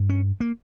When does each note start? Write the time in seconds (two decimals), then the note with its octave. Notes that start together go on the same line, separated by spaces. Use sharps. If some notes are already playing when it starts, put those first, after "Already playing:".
Already playing: G2
0.09 C#4
0.40 A#3